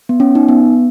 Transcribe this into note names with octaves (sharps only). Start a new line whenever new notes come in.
B3
C#4
D#4
B3